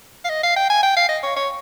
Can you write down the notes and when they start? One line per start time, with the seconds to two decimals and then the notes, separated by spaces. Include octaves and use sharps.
0.25 F5
0.30 D#5
0.44 F5
0.56 G5
0.70 G#5
0.83 G5
0.97 F5
1.09 D#5
1.23 C#5
1.36 C#5